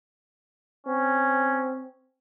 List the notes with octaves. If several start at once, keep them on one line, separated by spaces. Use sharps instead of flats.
C4 C#4